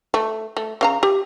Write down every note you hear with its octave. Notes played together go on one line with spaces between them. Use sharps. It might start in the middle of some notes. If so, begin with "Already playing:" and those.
A3
A3
C#3 F5 A#5
G4